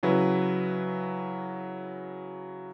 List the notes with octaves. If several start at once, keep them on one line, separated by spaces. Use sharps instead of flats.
C#3 F#3 E4 B4